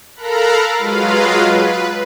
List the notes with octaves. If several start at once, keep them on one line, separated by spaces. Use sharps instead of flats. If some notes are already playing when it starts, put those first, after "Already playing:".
A4 A#4 F5 A#5 B5 F#6
F#3 G#3 F4 B4 F5
B4